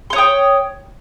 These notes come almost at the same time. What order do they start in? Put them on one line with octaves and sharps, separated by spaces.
C6 C#5 D#6 G5